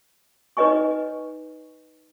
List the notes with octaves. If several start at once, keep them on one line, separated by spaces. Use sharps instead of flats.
D#4 B4 C#5 D#5 G#5 C#6